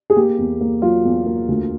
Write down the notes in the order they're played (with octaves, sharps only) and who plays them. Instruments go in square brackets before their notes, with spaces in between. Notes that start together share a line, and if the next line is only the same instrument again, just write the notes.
[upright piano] G#4
A#3 G4
E2
A#3
F#3 F4
E2
A#3
D2